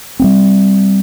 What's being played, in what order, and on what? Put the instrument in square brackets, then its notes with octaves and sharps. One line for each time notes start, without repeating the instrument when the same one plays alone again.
[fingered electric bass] G3 A#3 C4